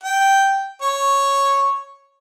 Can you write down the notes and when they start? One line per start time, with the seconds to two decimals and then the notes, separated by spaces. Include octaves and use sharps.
0.04 G5
0.82 C#5 C#6